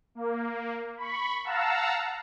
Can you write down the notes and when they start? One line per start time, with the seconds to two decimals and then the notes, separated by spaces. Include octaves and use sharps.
0.15 A#3
0.97 B5 C#6
1.44 F5 F#5 A5 A#5 E6